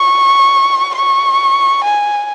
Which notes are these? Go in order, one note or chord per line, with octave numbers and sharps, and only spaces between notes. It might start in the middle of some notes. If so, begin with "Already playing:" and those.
Already playing: C#6
C#6
G#5